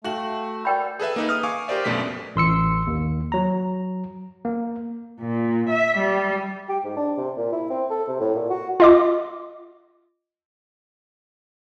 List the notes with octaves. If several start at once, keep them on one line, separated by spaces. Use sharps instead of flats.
A3 F#4 F5 G5 F#7
A#4 D5 F#5 G5 B5 G6
G#4 A4 B4 E5
A#3 D#4 B4
D#6 F6
F5 G#5 C#6 D6
G4 A#4 C5 D5 E5
A#1 F#2 B2 A3 D5 B6
A1 C6 E6 C#7
D#2
F#3 A#5
A#3
A#2
E5
G3
G4
G#2
D4
C3
A#2
E4
C4
A4
C3
A2
A#2
F#4
F4 D#5 D6